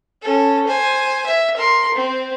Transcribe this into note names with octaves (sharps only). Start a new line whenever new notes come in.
C#4 A4
C5 G#5
E5
A#4 C6
C4